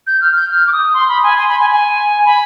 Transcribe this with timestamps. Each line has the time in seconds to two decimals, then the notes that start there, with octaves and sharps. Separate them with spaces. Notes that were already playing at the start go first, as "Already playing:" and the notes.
0.07 G6
0.21 F6
0.36 G6
0.51 F6
0.67 D6
0.72 D#6
0.94 C6
1.09 B5
1.23 G#5
1.38 C6
1.48 B5
1.60 G#5
1.70 G#5
2.25 B5